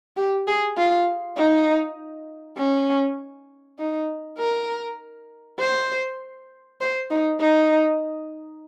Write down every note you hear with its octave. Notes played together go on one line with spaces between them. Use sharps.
G4
G#4
F4
D#4
C#4
D#4
A#4
C5
C5
D#4
D#4